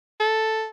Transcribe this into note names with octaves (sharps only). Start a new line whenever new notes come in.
A4